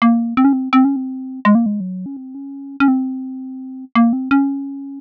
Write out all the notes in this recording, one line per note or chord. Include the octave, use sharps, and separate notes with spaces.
A#3
C4
C#4
C4
C4
C#4
C4
G#3
A#3
G#3
F#3
C#4
C4
C#4
C#4
C4
A#3
C4
C#4